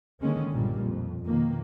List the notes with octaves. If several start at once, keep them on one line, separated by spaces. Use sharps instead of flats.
D3 D#3 G#3 A#3 C#4
B1 G2 A#2 G3 A#3
F2
F2 B2 D#3 A#3